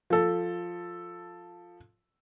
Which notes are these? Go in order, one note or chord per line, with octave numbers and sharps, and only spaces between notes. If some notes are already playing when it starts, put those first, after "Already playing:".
F3 A4